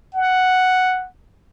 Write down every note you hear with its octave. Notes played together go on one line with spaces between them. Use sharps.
F#5